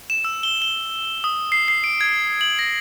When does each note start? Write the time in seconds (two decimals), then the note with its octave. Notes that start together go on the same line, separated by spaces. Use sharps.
0.10 E7
0.25 E6
0.43 G7
0.62 G7
1.24 D#6
1.52 C7
1.68 C7
1.84 D7
2.01 G#6
2.41 F#7
2.59 A#6